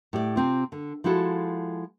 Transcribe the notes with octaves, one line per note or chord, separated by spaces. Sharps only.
A2 G4 D5
C3 C4 F4
D3
F3 G#3 E4 F#4 A4